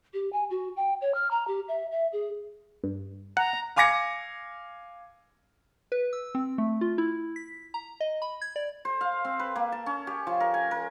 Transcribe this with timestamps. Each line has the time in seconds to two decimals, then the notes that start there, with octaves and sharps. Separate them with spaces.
0.13 G4
0.33 G#5
0.50 F#4
0.76 G5
1.01 C#5
1.14 F6
1.31 A#5
1.47 G4
1.68 E5
1.91 E5
2.13 G#4
2.84 G2
3.37 F#5 A#5
3.76 F5 G#5 D6 G#6 A#6 C#7
5.92 B4
6.13 E6
6.35 C4
6.58 A3
6.81 F4
6.98 E4
7.36 B6
7.74 A#5
8.00 D#5
8.22 B5
8.41 G#6
8.56 D5
8.85 C5
9.01 F5
9.25 C4
9.40 B4
9.56 A#3
9.72 A5
9.86 C#4
10.07 G4
10.27 F3
10.40 A#4
10.54 G#5
10.71 A#4